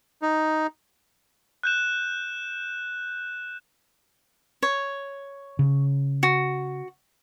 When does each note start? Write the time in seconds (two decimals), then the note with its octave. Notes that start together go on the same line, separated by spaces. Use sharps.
0.22 D#4
1.63 F#6 G6 E7
4.63 C#5
5.59 C#3
6.23 F#4